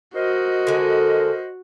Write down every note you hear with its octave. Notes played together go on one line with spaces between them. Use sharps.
F#4 A#4 C5 D#5
D3 G#3